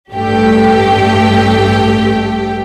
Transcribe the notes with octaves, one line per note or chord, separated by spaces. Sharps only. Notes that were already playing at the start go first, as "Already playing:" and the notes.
A1 G2 A3 G4 G5